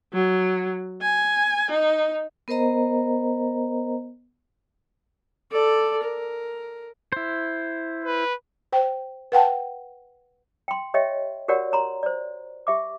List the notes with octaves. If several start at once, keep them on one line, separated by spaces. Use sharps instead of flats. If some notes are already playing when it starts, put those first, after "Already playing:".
F#3
G#5
D#4
B3 A#4 C5 D#5 A#5
A4 D5
A#4
E4 C5
B4
C5 G5
B4 F#5 G5 A5
G5 C6
G4 C#5 D#5 E5 G5
F#4 G4 A#4 C#5 D5 F#5
C#5 A#5 C6
C5 D5
G4 E5 D6